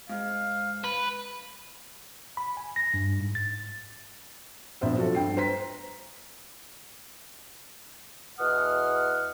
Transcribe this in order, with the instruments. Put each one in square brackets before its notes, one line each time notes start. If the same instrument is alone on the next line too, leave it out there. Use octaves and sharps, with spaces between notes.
[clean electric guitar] G#2 [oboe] F5
[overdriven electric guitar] B4
[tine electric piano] B5
G#5
A#6
G2
G#2
A6
[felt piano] A#1 B3 C5 E5
F3 F#3 F#4 A4
G2 G5 C7
B4 C5 A#5 B6
[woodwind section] E2 B2 F#5 D#6 F6